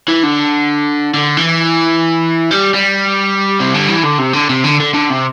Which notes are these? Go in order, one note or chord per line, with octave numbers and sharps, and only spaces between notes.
E3
D3
D3
E3
G3
G3
C3
D3
E3
D3
C3
D3
C3
D3
D3
D3
C3